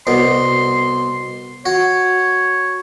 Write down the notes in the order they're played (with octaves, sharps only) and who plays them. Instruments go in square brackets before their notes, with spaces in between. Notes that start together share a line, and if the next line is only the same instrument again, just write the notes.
[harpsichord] C2 B2 [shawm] C6
[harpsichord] F#4 [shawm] C#5